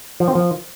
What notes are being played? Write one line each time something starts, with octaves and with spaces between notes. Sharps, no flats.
F3
C4
F3